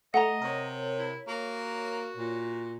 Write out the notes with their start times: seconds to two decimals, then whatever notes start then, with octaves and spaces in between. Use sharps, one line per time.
0.14 A3 D#5 F#5 A#5
0.42 C3 A#4 C#5
0.99 E4
1.28 A#3 F#4
2.17 A#2